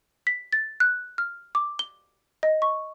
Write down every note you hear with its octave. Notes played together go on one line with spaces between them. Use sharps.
B6
A6
F#6
F6
D6
G7
D#5
C#6